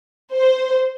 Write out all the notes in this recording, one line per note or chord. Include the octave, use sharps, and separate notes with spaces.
C5